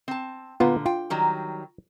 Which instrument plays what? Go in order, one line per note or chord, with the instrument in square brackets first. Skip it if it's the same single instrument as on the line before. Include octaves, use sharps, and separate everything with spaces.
[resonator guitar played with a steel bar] C4 A5
[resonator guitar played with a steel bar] A#2 D3 [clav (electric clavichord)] B3 F4
[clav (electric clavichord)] F4 [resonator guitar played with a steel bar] G5
[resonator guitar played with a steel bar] D#3 F#3 G3